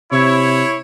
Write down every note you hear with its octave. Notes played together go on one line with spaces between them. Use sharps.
C3 E4 C#5